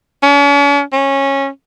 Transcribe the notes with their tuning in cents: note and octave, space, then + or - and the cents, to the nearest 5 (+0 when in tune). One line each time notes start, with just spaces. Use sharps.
C#4 +45
C#4 -15